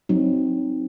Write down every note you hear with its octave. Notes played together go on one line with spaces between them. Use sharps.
F#3 C4 D#4